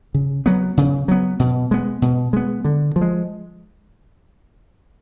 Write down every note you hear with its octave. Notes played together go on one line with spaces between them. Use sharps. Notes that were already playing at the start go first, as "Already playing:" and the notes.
C#3
F#3 B3
C#3
F#3 B3
B2
G#3 B3
B2
G#3 B3
D3
F3
G#3